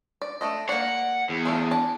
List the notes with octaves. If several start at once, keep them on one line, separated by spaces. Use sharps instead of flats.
D5
A3 D4 D#5
A#3 D5 F#5
E2
F3 A3 D4
D4 A5